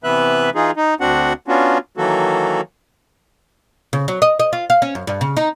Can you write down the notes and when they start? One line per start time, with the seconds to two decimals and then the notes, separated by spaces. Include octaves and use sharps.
0.04 C3 E3 B3 B4 E5 F#6
0.55 E3 D#4 F4 G#4
0.77 D#4
1.01 D2 C4 D4 F#4 F#5
1.48 B3 C#4 D4 F4 F#4
1.97 D#3 E3 F#3 A#3 F#4 A4
3.93 C#3
4.08 F#3
4.22 D#5
4.40 D#5
4.53 F4
4.70 F5
4.82 C#4
4.95 F#2
5.07 G2
5.21 C#3
5.37 D#4